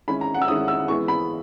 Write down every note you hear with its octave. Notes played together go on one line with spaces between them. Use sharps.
D#3 G#3 C#4 E4 B5
A#5
F#5
E6
D#3 G#3 C#4 E4 D#6
E6
E3 G#3 B3 C#6
B5